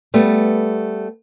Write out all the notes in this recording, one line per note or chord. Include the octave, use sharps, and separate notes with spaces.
G3 A3 B3